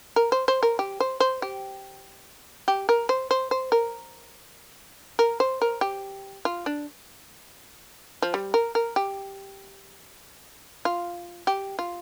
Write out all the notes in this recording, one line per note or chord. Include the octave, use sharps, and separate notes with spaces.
A#4
C5
C5
A#4
G4
C5
C5
G4
G4
A#4
C5
C5
C5
A#4
A#4
C5
A#4
G4
F4
D4
F3
G3
A#4
A#4
G4
F4
G4
F4